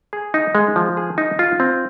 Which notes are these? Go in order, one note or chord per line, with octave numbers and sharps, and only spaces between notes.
G#4
D#4
G#3
F3
G#4
D#4
F4
C4